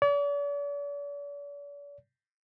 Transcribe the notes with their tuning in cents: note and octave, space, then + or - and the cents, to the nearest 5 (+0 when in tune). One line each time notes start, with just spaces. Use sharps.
D5 -45